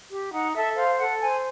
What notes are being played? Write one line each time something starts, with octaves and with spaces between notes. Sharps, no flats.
G4
D#4 F#5
A4 E5
C5 F5
A4 F#5
C5 G#5